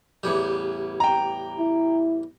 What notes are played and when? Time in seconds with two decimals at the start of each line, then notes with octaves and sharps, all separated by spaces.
0.23 A1 E2 G3
1.00 G5 A#5
1.59 E4